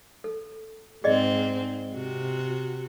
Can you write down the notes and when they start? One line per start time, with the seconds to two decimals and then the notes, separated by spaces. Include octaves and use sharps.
0.24 A4
1.04 G#2 C4 G#4 D5 D#5
1.95 C3 F#4